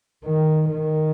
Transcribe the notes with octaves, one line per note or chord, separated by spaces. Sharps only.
D#3
D#3